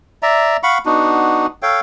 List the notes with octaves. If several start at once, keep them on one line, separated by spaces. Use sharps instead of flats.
D5 E5 A#5
F5 F#5 B5 C#6
B3 D4 D#4 F#4
A4 C#5 F5 G5